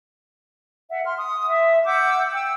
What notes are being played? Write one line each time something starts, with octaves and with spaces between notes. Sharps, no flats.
E5 F#5
C6 F6
D#6
E5
F#5 D6 E6 G6
G5 E6